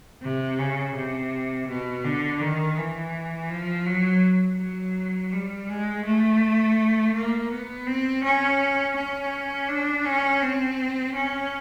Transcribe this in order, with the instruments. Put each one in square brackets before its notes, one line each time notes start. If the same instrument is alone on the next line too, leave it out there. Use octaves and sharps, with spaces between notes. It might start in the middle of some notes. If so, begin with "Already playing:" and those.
[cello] C3
C#3
C3
B2
D3
D#3
E3
F3
F#3
F#3
G3
G#3
A3
A#3
B3
C4
C#4
C#4
D4
C#4
C4
C#4